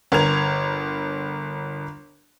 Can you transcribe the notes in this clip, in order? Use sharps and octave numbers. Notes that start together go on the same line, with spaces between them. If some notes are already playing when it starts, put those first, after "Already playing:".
G1 A#4 G#6 F7